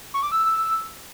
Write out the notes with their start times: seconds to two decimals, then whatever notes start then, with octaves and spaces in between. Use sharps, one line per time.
0.14 C#6
0.23 D6
0.32 E6